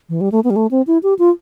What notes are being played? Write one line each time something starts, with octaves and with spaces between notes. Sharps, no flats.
E3
G3
A3
B3
G3
A3
C4
E4
G4
F4